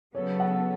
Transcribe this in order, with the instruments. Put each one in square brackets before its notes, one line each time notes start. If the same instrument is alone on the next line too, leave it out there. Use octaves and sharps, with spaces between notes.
[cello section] C#3 F#3 B3 A4 [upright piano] C#5
[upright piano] F#5